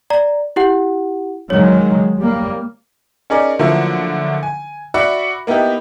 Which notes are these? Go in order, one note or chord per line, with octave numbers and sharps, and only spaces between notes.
D5 A#5
E4 G4 F#5
D#3 F#3 G#3 C#5
G3 A#3
C#4 D#4 G#4 A#4 D5
D3 F3 F#3 A3 A#3 E4
G#5
F#4 D5 E5 F#5 B5
A#3 B3 D#4 E4 G4